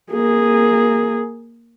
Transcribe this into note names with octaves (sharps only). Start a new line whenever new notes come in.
A#3 G#4